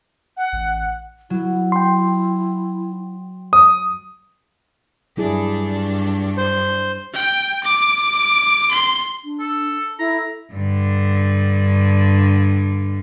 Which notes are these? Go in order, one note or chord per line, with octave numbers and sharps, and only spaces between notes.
F#5
A1
F#3 E4
G5 C6
D#6
G2 F#3 D4 E4 G#4
C5
G5
D6
C6
D4
A4
E4 A4 A#5
G2 D3